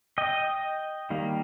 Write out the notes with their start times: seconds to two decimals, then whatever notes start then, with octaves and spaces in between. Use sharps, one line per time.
0.18 D#5 G5
1.10 D#3 G3 A#3